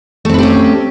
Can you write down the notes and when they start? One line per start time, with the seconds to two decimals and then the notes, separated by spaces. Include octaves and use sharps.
0.25 A3
0.29 C4
0.34 B4
0.38 G4
0.43 C#4